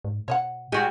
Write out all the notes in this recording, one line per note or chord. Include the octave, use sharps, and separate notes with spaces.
G#2
B2 C#5 D#5 F#5
G3 G#3 F#4